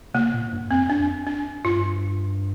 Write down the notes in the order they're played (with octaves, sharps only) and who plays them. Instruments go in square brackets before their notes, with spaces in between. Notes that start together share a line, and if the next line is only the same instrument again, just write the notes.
[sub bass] C3 [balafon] A#3
[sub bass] A#2
G2
[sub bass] F2 [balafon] C4
[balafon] D4
D4
[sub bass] G2 [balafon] F4